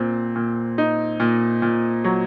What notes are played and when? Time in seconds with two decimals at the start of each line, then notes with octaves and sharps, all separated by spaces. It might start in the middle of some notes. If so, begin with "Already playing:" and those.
Already playing: A#2 C4
0.36 A#2
0.78 D#4
1.20 A#2
1.62 A#2
2.04 F#3